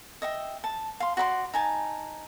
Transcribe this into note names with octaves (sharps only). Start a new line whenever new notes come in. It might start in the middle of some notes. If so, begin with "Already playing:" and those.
D#5 E5 G5
A5
F5 C6
F#4 D5 B5 C6
D#4 G#5 A5